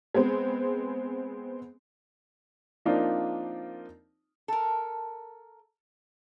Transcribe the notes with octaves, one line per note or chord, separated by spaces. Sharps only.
G#3 B3 C4 G#4
F3 A#3 C4 D4 D#4 F4
A4 A#4